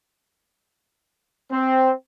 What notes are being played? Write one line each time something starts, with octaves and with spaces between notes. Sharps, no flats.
C4